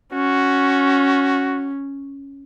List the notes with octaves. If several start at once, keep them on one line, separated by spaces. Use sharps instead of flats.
C#4 F#4